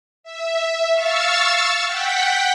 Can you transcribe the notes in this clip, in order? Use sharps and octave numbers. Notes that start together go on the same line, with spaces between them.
E5
F5 C#6 E6 A6
F#5 G5 B6